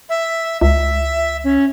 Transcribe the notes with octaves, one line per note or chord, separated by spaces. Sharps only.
E5
C#2 E5
C#4